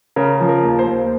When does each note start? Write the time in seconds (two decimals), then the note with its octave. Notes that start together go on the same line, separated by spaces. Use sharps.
0.16 C#3 A#4
0.40 F3
0.49 A#4
0.63 D#2
0.79 C5
0.87 D#2